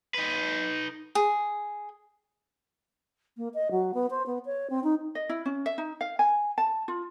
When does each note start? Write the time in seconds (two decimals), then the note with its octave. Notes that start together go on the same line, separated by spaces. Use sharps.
0.14 D#4 B4
1.15 G#4
3.37 A#3
3.54 D#5
3.71 F#3
3.94 B3
4.10 C5
4.26 B3
4.45 C#5
4.70 C4
4.84 D#4
5.15 D#5
5.29 E4
5.46 C#4
5.66 E5
5.78 D#4
6.01 F5
6.19 G#5
6.58 A5
6.88 F4